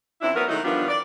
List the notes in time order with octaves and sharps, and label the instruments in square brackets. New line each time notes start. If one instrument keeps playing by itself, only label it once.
[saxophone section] F#2 C4 D4 E4
F#3 B3 A#4
D#3 F#3 G#3 A3 D#4 E4
D#3 F3 G3 B3 D4 F4
D5